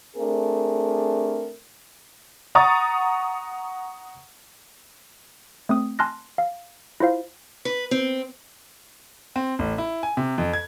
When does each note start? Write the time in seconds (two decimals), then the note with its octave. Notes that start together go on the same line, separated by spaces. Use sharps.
0.17 A3 C4 D4 G#4 A#4
2.55 F#5 A#5 C#6 D#6 A6
5.69 A3 C4 D#6
5.99 G#5 A5 C6 F6 F#6 A#6
6.38 F5
7.00 E4 F4 C5 F5
7.65 B4
7.91 C4
9.36 C4
9.59 A1
9.78 E4
10.03 G#5
10.17 C3
10.38 F2
10.53 G#6